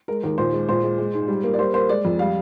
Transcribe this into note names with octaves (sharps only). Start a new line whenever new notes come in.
G#3 A#4
D#2 A#4
A#2 C5
G#3
A#2 C5
G#3
G#3
G#2
G3
A#3
D5
G3 C5
A#3 C5
G#3 D5
F2
G3 F5